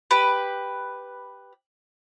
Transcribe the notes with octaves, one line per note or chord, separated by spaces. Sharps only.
G4 B4